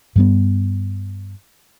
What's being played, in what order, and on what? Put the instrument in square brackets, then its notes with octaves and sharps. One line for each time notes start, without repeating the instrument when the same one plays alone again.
[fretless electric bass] G2 G3 B3